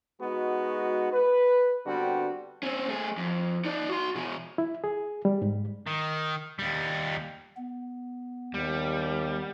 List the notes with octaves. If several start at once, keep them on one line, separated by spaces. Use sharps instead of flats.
G#3 B3 D#4 F#4
B4
D3 G3 B3 C4 D4 F#4
C4 C#4
A3 G#4
F2
D#4 D5
F#4 C6
B2 G#4
E4
G#4
G3
G#2
D#3
D#2 G3
B3
D#2 G3